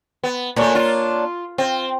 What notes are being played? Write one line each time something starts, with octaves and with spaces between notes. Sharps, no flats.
B3
A#2 A3 A#3 D4 C#5
F4
C4 F4